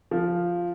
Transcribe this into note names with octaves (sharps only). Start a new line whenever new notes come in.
F3